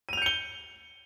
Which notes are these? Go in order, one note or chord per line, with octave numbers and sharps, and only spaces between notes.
G6 C#7 D#7 F7 G7